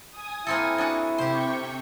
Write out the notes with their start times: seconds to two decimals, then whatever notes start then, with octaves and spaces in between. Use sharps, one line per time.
0.11 G#5 D#6
0.47 A#3 C4 E4 A4
0.76 C3 D4 F#4
1.18 C3 G4 C5 G5 C#6